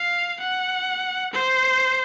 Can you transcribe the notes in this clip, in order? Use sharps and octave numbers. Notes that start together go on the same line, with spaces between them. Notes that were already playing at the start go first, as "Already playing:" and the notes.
Already playing: F5
F#5
C5